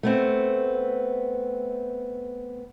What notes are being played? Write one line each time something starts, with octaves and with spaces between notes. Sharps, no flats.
A3 B3 C4